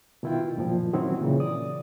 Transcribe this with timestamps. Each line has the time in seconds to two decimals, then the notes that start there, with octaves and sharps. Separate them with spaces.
0.23 B2 D#3 E4 F4 G5
0.57 F#2 A#2 F3
0.93 D#3 F#3 C4 C#4 D#4 E4
1.21 A#2 C#3 E3
1.40 D5 D#6